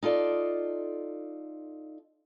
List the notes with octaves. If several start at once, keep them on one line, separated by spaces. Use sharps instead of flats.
D#4 F4 A4 D5